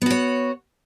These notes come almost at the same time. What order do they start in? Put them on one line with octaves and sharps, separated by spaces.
B3 F#4 C#5